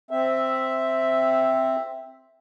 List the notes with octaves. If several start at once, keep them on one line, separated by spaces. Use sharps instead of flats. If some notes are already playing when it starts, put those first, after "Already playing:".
C4 E5